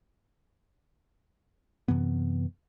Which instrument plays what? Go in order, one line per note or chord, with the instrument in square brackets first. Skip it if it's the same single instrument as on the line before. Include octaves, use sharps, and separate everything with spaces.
[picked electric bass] F#2 C3 E3 B3